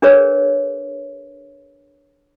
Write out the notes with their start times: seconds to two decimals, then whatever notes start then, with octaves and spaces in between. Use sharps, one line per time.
0.02 D4 G#4 A#4 B4 C#5